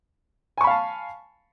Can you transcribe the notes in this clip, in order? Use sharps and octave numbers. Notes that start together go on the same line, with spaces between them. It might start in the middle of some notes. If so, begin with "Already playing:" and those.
F5 G#5 A5 B5 C#6